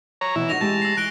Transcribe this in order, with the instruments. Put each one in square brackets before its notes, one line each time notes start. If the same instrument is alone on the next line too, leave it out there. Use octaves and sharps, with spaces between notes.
[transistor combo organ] C#5 A#5
[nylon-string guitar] B2 [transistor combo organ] E3 E4
[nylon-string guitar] D#4 F#4 [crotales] C#6 A#6 F7
[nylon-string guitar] G#3 G4 G#4 [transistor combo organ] A5
[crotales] E6 C7
[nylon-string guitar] E3 [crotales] F#6 D7 G7